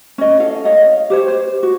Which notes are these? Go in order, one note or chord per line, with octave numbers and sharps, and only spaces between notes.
C#4 D#5
E4 A4 F5
C#5 D#5 F5
G4 C5 C#5
C5
F#4